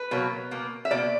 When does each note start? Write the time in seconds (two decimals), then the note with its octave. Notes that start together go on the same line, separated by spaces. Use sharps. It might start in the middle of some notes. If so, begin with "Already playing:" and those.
Already playing: B4
0.11 B2 F#3 A#3
0.51 B2 A#3
0.85 E5
0.91 B2 A#3 D5